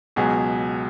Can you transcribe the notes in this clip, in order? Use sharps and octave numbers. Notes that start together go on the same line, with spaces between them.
C#2 B2 F#3 G#4